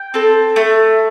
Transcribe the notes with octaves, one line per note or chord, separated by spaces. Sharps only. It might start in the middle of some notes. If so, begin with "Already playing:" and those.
Already playing: G5
C4 A4
A3